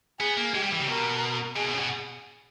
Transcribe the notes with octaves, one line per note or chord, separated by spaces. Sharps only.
B3 G#4
A#3
G#3 G4
G3
E3
C#3
B2 A#4
B2 G#4
B2
C#3
B2